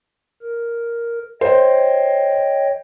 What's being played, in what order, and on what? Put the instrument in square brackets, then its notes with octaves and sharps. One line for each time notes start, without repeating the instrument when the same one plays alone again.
[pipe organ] A#4
[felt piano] C5 [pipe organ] C#5 D#5 G5